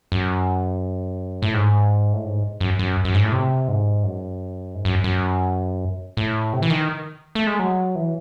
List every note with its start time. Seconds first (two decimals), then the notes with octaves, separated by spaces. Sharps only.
0.12 F#2
1.42 A2
1.54 G#2
2.13 A2
2.25 G#2
2.60 F#2
2.79 F#2
3.05 F#2
3.14 G#2
3.23 A2
3.32 C3
3.68 G#2
4.04 F#2
4.75 G#2
4.85 F#2
5.04 F#2
6.17 A2
6.53 C3
6.62 E3
6.70 D#3
7.35 A3
7.47 G#3
7.59 F#3
7.96 E3